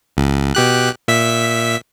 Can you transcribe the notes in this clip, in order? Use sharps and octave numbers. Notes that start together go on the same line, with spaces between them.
C#2
B2 G4 F#6
A#2 E5 B6